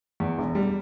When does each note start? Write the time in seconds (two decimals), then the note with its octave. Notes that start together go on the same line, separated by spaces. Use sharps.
0.20 E2
0.38 E1
0.55 G3